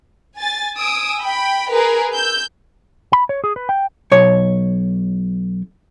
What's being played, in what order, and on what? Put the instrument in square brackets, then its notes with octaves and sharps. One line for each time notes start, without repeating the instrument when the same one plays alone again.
[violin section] G#5 A6
G#5 D#6 E6 D7
G5 B5
G#4 A#4 B4
E6 G6
[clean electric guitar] B5
C#5
G#4
B4
G5
[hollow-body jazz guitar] B1 C#5